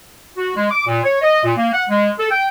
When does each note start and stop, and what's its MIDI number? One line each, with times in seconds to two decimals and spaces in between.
0.36 0.51 66
0.55 0.70 56
0.70 0.82 86
0.87 0.99 46
1.03 1.19 73
1.22 1.43 75
1.44 1.52 46
1.57 1.69 58
1.73 1.83 78
1.89 2.10 56
2.18 2.26 69
2.31 2.48 79